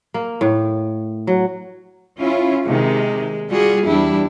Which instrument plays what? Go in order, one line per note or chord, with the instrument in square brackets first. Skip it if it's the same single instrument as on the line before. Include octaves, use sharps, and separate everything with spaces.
[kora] A#3
A2
F#3
[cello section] C#4 E4 F4
[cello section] C3 D#3 [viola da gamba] G#3
[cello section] G3 [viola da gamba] F4 F#4 G#4
[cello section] E2 [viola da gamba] G3 D4 E4